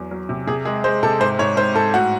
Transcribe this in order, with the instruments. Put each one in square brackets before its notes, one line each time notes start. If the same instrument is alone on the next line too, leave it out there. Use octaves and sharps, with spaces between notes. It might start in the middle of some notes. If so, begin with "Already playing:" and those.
Already playing: [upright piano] E2 F#3
F#3
C3
C3 G#4
G#3 G#4
G#3 C5
C3 A4
G#2 C5
G#2 C#5
G#2 C5
G#2 A4
A2 F#4